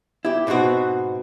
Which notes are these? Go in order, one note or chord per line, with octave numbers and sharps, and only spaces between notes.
E4 G4
G#2 B2 B3 C4 F#4